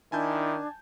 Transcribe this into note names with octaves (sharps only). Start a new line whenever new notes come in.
D#3 D4 E4 G#5 A5 G6